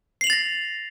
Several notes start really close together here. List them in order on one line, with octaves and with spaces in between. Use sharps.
C7 F#7 F7 A6 A#6